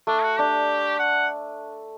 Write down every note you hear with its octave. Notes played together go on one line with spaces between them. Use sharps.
A3 D4
F#4
D4 G4
F#5